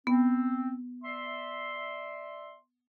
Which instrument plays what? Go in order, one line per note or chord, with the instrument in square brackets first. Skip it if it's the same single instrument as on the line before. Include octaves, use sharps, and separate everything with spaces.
[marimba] B3 [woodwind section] C4
[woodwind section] D5 E5 C6